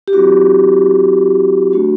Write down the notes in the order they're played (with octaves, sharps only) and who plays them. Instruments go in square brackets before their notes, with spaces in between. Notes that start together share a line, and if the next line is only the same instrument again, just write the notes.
[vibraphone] G4
F#3 C4 E4 F#4
A3 D4 F#4